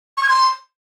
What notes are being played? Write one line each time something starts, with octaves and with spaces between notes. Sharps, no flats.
C#6
G#6
C6